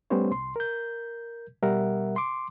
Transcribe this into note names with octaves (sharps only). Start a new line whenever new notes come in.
G3 A3 B3 C#4 C5 C#5
C2 C6
A#4 G6
B2 G3 A#4 E5 F#5
C6 D6